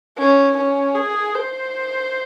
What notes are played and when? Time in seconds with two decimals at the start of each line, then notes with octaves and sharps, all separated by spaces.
0.18 C#4
0.57 C#4
0.95 G#4
1.35 C5